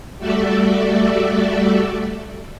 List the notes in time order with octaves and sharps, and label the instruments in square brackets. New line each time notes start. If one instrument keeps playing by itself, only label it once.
[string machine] G3 A3 F#4 A4 D5 E5